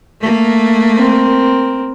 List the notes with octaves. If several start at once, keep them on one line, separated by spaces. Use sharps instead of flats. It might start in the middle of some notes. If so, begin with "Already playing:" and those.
A3 A#3
C4 A#4